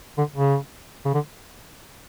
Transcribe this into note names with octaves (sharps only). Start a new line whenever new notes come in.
D3
C#3
C#3
D3